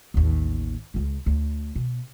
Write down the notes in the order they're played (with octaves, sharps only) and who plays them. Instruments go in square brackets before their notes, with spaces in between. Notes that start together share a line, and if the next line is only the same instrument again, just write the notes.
[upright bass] A1 D#2
C#2 G#3
D2
B2